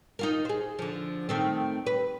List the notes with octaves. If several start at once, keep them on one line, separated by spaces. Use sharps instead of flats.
D#4 F4 A#4
G#4 C5
D3 F3
D#3 A3 C4
B4